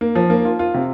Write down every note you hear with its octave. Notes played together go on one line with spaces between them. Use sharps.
A#3
F3
A#3
F4
F4
C3